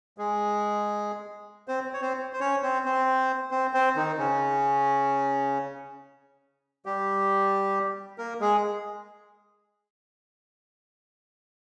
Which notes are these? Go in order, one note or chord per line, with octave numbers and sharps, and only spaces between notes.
G#3 G#4
C4 C5
C#5
C4 C5
C5
C#4 C#5
C4 C5
C4 C5
C4 C5
C4 C5
D#3 D#4
C#3 C#4
G3 G4
A#3 A#4
G#3 G#4